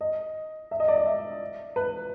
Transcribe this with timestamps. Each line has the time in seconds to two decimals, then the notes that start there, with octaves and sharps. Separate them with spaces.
0.01 D#5
0.71 E5
0.80 D#5
0.88 D5
0.98 D#5
1.06 E5
1.76 B4